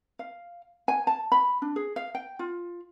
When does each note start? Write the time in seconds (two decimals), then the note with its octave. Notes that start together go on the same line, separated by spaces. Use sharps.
0.19 F5
0.88 G#5
1.07 A5
1.32 B5
1.62 D4
1.76 G#4
1.96 F5
2.15 G5
2.39 F4